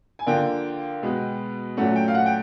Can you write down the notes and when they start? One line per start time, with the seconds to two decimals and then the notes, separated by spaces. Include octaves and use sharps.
0.19 G#5
0.26 D3 F3 A#3 G5
1.02 B2 G#3 B3
1.77 A#2 F#3 A3 C#4 F#5
1.96 G5
2.08 F5
2.14 F#5
2.26 G5